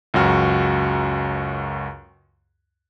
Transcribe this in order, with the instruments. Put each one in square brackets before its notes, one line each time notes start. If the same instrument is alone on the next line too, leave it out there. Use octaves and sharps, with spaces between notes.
[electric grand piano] C#2 F#2 F#4 F6